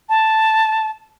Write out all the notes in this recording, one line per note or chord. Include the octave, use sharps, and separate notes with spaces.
A5